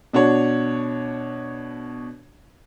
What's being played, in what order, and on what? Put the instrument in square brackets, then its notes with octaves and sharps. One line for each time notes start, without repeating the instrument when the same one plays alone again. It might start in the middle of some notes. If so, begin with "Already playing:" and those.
[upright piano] B2 D4 F#4 C#5